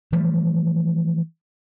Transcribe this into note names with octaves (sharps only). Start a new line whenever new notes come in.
E3 F3 G3 A3